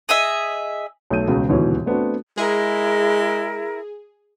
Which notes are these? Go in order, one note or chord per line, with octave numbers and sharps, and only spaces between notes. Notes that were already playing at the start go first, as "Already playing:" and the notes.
G#4 D#5 E5
B1 A3 G6 D#7
E1 C#2 B2
D#1 D2 G#2 B2 E3 C#5
A3 B3 C4 D4 F#4
G#3 E4 G#4 A#4